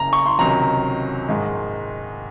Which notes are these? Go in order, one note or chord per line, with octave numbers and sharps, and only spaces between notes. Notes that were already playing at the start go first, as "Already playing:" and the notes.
Already playing: F#1 F#2 C#3 A#5
C#6
C6
C#2 C3 D#3 F#3 A#5
A#1 G#2 D#3 G#3